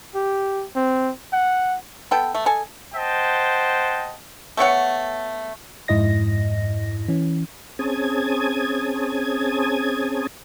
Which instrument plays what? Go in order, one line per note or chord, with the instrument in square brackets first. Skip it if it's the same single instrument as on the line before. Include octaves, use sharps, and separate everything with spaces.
[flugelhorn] G4
C4
F#5
[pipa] B3 A4 G5
A3
A4 D#5 G#5
[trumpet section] C5 D#5 F#5 G5 A5
[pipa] A3 B3 C#5 F#5
[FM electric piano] F2 G#2 E4 D#5 A#6
E3 C#4
[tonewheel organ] C4 C#4 G#4 A5 D#6 G#6